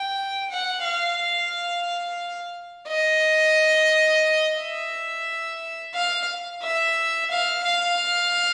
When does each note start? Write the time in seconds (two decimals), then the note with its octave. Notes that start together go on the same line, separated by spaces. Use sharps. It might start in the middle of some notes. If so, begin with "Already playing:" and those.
Already playing: G5
0.51 F#5
0.84 F5
2.88 D#5
4.58 E5
5.94 F5
6.62 E5
7.30 F5
7.64 F5